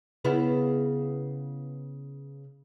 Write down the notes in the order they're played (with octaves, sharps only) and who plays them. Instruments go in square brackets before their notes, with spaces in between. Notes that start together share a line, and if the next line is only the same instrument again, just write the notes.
[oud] C#3 B3 E4